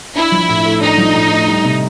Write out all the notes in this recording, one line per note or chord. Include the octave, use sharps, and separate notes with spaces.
D4 E4
F3
A2
A3
D4 D#4
F3
A2
A3
G3
C3